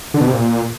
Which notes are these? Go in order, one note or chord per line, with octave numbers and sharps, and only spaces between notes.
D3
B2
C3
A#2